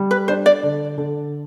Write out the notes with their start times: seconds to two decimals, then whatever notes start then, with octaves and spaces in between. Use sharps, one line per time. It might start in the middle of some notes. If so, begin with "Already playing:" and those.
Already playing: G3
0.11 B4
0.28 D4 C5
0.46 D5
0.63 D3
0.98 D3